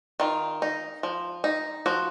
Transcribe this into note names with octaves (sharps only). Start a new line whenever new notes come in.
D#3 F4
D#4
F3
D#4
F3 F#4